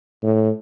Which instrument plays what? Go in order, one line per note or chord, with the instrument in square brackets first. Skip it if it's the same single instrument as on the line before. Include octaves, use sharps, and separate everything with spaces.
[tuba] A2